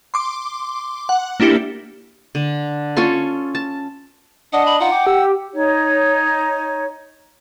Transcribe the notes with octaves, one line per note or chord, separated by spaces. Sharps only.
C6 D6
F#5
A#3 D4 E4 G4 C#7
D3
C#4 F4 A4 C6
A5
D4 D#5 F#5
B5
D#4 F4 F#5
G5 D6
G4 E6
D#4 C#5